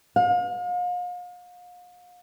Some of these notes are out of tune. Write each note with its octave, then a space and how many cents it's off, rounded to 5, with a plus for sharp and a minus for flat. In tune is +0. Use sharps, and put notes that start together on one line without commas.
F5 +40